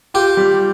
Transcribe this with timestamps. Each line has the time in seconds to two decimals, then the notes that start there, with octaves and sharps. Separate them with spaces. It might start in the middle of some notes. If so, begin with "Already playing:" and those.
0.14 F4 G4
0.37 G3